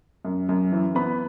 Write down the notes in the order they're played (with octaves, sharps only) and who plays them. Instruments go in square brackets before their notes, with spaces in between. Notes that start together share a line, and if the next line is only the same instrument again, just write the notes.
[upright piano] F#2
F#2
E3
B3 B5